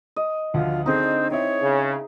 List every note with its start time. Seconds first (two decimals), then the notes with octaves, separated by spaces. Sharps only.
0.16 D#5
0.54 D2 F3 F4 F#5
0.86 D3 C4 D4 D#4 G#4
1.31 C4 E4 C#5
1.63 C#3